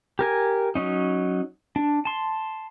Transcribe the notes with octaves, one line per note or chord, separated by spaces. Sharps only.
G4 A#4 G#5
F#3 C#4 D#4
D4
A5 C6